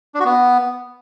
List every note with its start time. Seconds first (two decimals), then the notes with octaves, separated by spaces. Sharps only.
0.14 D4
0.20 F#4
0.25 B3